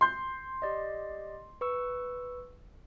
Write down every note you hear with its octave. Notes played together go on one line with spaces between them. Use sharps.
C6 G6
G4 D5 D#5
B4 C#6 E6